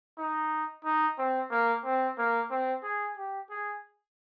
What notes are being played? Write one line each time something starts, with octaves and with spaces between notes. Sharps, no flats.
D#4
D#4
C4
A#3
C4
A#3
C4
G#4
G4
G#4